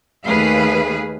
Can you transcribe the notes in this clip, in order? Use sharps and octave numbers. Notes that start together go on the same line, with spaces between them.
D#2 A3 G#4 B4 F5